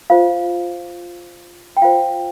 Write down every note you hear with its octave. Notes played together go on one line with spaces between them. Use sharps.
F4 C5 F5
G5
F4 C5 F5